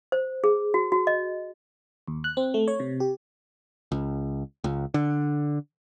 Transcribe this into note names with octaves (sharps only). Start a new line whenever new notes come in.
C5
G#4
F#4
F#4
D#5
D#2
F#6
C4
A3
C#5
C3
G4
C#2
C#2
D3